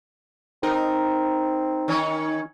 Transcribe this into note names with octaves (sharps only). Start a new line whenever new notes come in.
C4 D#4 A#4
D#3 C#4